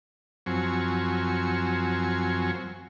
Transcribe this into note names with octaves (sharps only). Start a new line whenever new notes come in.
F#2 F3 F#3 C4 G#5 C#6